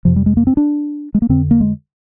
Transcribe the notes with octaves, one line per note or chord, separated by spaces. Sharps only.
F2 C3 F3
G3
G#3
A#3
C4
D4
G#3
A#3
F2 D3 C4
A#3
G#3